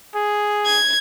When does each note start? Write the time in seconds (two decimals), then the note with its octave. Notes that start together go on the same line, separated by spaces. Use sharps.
0.15 G#4
0.66 G#6